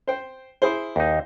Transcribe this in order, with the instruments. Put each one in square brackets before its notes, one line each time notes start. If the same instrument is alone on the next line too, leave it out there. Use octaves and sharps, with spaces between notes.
[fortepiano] C5 G5
E4 G#4 C5
[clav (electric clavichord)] D#2 D#4